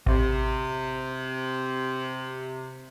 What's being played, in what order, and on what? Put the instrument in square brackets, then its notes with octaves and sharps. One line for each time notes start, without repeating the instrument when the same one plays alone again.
[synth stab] A1 [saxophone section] C3